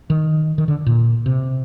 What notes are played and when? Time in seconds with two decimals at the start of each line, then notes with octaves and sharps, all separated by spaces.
0.10 D#3
0.58 D#3
0.68 D3
0.86 A#2
1.26 C3